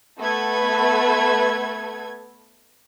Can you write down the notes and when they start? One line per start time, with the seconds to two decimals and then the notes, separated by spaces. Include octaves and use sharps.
0.20 A3 B3 A4 B4 G#6